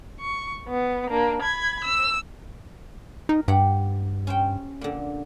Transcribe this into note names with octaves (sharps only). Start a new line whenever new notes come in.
C#6
B3
A#3 D4
B5 G#6
E6
D#4 A#4
G2 G4 F#5
C#4 C5 G5
A#2 D3